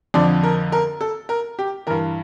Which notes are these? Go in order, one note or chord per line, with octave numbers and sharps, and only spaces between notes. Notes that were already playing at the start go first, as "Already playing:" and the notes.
F2 D3 F3 D5
A#4
A#4
A4
A#4
G4
G2 E3 A#4